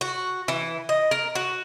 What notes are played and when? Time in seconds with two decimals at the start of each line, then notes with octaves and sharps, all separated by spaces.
0.01 F#4
0.48 E3
0.89 D#5
1.11 A#4
1.35 F#4